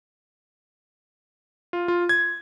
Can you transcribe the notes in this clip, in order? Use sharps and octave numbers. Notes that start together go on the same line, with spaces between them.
F4
F4
G#6